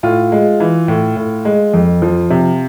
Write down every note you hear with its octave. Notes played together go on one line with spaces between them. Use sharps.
A2 F4
G#3
E3
A2
A2
G#3
F2
F3
C3